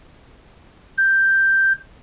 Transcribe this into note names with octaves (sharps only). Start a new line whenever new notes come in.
G6